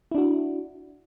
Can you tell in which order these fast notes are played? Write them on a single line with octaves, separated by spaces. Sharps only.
E4 D4 F#4